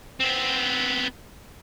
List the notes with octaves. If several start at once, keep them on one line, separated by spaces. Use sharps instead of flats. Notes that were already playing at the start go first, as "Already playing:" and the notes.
B3 C4